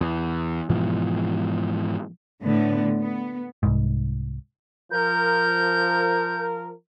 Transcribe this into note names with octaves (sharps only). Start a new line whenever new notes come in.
E2
G#2 B2 E3 F3
A2 D3 B3
B3
C2 G#2
F3 A#4 G6